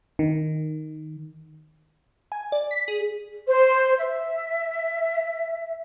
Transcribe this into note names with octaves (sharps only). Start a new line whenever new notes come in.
D#3
G#5
D5
B6
G#4
C5
E5